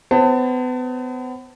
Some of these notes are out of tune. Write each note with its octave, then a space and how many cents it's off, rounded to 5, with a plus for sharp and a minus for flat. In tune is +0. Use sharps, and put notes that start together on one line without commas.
B3 +35 C5 +30 A5 +25